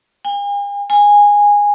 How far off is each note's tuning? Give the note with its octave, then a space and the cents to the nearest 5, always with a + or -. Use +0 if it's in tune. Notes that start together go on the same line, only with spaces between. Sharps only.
G#5 -45
G#5 -15